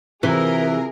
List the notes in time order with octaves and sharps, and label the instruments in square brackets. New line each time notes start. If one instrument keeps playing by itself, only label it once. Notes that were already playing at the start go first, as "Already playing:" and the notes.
[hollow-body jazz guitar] C3 [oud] E3 [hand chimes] F4 [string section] G#4 A#4